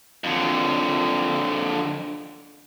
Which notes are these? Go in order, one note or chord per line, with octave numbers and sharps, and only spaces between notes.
F2 D3